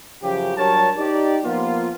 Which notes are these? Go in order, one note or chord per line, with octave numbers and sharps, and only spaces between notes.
F#2 C#3 F3 G4
F#3 G3 D4 A#4 C#5 A5
D#4 G4 D5
F3 A#3 B3 F4